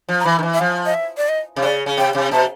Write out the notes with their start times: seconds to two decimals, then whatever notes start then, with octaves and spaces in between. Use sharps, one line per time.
0.09 F3
0.20 A#5
0.25 E3 B5
0.39 D#3
0.43 E3
0.54 E5
0.60 F3 F5
0.85 D#5
0.94 E5
1.17 D5
1.29 D#5
1.56 C3
1.63 C#3 D5
1.86 C#3
1.97 C3 G5
2.15 C3
2.31 B2 A5